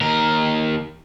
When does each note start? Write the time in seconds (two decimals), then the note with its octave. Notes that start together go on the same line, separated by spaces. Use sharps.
0.01 D#2 A#4